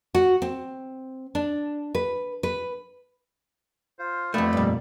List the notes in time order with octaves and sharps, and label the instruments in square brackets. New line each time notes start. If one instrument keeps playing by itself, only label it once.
[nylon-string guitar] F#4
C4
D4
B4
B4
[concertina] F4 C5
[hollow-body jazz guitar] F2 A3 [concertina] B3 D5 B5
[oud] G2 A#2 [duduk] G3